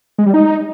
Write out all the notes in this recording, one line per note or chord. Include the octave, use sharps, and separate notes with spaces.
G#3
G3
D#4